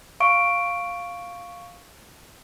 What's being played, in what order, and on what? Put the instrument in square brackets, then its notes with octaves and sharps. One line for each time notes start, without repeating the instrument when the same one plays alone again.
[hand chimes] F5 C#6 D7